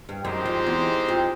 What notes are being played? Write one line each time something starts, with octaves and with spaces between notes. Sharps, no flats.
G2
F#2 G#3 C4 D#4 G4 C5
F2
E2
F2